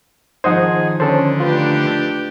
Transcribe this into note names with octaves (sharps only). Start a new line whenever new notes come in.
D#3 F3 D#4 G#4 C5 D#5 F#5
D3 C#4 A4 C5
A3 D4 F4 G4 B4